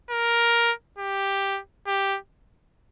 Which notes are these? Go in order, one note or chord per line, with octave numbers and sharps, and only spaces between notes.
A#4
G4
G4